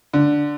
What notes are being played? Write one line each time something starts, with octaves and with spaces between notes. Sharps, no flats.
D3